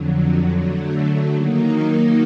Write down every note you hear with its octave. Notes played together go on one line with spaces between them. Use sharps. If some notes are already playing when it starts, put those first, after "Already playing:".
Already playing: F2 D3 F#3
D3 F#3 A3
D#3 F#3 A#3 D#4